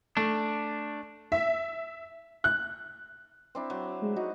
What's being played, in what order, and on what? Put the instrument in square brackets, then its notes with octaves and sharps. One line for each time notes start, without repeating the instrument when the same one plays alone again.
[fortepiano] A3 [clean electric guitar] D4
[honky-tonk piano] E5
F#6
[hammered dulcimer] C4 D4 E4
F#3
[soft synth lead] G#3
[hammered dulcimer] D#4 [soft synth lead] F#4